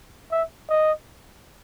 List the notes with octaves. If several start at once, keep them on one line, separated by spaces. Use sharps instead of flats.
E5
D#5